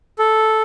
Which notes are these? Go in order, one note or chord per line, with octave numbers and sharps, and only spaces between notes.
A4